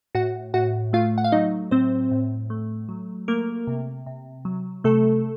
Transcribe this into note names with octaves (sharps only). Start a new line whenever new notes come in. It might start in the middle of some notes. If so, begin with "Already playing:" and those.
A2 F#4 F#5
A2 F#4 F#5
A3 F4 F5
F#5
F5
F#3 D#4 D#5
A2 C4 C5
A2
A3
F#3
A3 A#3 A#4
C3
C3
F#3
C3 A3 A4